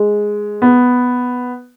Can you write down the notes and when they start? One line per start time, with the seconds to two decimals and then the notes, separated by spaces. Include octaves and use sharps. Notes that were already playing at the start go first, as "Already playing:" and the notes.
Already playing: G#3
0.62 B3